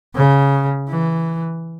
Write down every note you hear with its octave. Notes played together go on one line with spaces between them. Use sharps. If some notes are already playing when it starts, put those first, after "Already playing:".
C#3
E3